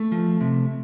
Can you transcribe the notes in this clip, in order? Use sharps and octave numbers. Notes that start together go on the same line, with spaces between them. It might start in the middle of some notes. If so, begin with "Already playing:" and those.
Already playing: A3
F3
C3